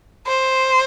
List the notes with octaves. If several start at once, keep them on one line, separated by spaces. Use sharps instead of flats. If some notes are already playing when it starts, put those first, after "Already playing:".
C5